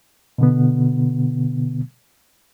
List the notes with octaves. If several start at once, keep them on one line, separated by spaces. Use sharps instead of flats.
B2 D3 B3